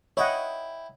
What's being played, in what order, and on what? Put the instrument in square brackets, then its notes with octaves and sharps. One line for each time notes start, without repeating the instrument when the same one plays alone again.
[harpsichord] E4 G5 [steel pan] C#5 D#5 F#5